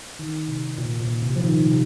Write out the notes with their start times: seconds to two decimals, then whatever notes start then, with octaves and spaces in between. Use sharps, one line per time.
0.19 D#3
0.48 C3
0.78 A#2
1.00 A#2
1.22 C3
1.36 F3
1.44 D#3
1.66 C3